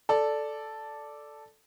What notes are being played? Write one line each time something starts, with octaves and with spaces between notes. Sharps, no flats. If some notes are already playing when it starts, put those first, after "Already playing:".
A4 D5